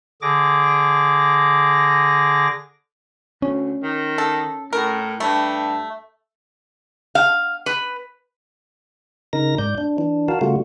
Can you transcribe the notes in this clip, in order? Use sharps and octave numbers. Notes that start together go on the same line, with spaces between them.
D3 G#4 D6 A#6
D2 C#4
D#3
A4
A2 A#4
G2 A3
F5
B4
C#3 D#4 A#4 A#6
G#2 D5 G6
D4
E3 D4
F#4 A#4 F5 A5
C#3 G3 A3 F4 F#4